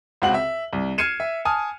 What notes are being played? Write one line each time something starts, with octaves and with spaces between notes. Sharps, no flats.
C#2 C3 C4 F#4 F#5 F#7
E5
C2
F6 G#6 C7 C#7 D#7 E7
E5
G#5 A5 D#6 F6